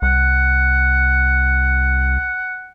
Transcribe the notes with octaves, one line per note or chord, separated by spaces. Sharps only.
C2 F#5